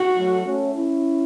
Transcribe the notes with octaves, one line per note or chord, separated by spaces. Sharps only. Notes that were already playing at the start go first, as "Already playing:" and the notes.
Already playing: F#4
F#3 A3
A3 C#4
C#4 E4